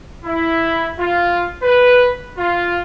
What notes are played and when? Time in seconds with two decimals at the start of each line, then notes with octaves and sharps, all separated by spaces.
0.24 E4
0.98 F4
1.62 B4
2.38 F4